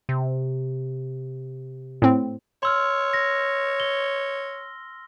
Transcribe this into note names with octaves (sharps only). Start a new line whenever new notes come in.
C3
A2 C4
C#5 C6 E6 F6
A#6
G7